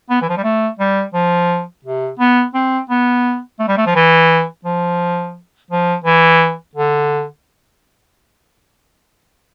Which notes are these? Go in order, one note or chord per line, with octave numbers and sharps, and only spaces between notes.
B3
E3
F3
G3
A3
G3
F3
C3
B3
C4
B3
A3
G3
A3
F3
E3
F3
F3
E3
D3